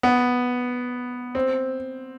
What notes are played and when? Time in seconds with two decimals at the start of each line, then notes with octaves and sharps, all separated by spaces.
0.03 B3
1.35 C4